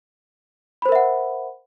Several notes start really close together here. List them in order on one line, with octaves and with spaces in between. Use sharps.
B5 C5 A#4 E5 F#5